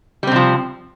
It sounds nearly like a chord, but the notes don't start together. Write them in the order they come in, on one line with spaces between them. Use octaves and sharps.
G3 C4 C3 F3